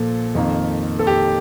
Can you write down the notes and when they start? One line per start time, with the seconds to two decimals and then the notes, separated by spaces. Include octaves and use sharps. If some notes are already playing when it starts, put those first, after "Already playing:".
Already playing: A#2 F3 A4
0.35 F2 D#3 A#3
0.99 A4
1.07 G4